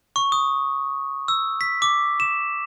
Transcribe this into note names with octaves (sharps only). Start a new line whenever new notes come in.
C#6
D#6
E6
B6
D6
E7